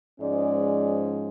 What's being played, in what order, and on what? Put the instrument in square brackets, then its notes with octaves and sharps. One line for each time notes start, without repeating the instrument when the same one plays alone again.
[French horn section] G#2 F3 G#3 C#4 D5